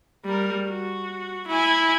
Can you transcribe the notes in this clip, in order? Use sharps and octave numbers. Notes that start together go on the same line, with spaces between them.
G3 A#4
F#4
E4 G#5